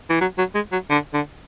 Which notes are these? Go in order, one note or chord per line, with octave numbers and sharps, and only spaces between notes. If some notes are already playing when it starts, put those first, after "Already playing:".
E3
F#3
F#3
G#3
F#3
D3
D3